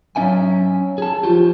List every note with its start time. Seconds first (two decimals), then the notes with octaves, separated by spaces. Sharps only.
0.16 F#3 C#4 E5 G#5
0.98 G#4 A5
1.23 F3 F4 G4